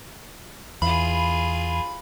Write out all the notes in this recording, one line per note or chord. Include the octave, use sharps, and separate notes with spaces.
E2 F4 G#4 B5